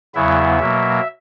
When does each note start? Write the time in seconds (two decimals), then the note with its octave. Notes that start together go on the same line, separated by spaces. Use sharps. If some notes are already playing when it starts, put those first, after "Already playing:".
0.15 E2 C#3 F#3 B3 E4 E5
0.60 B2 F#3 A#3